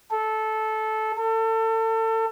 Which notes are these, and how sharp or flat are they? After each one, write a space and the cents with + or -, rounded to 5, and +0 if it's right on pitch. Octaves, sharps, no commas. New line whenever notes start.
A4 -15
A4 +30